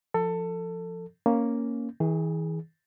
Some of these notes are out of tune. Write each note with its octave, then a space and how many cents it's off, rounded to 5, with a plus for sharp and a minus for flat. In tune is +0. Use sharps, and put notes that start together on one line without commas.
F3 -5 A4 +20
A#3 +0 C#4 +0
E3 -40 G#4 +0